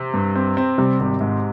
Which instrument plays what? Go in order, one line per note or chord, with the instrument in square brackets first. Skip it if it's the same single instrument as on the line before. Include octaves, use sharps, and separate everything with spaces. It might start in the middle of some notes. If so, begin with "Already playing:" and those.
Already playing: [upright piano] C3
[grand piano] G2
C4
C4
[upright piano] C3 [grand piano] G3
[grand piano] G#1
G#2